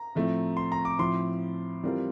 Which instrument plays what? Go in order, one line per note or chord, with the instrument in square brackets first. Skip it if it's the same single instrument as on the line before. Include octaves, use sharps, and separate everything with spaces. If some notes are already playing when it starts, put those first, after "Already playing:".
Already playing: [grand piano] A#5
[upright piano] A2 F3 A3 C4
[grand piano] C6
A#5
D6
[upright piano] A2 F3 C4 E4 [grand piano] C6
[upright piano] E3 G3 C4 F4 A#4